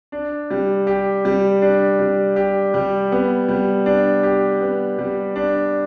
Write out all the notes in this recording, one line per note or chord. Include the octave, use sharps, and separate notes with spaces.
D4
G3
G4
G3
D4
G3
G4
G3
B3
G3
D4
G4
B3
G3
D4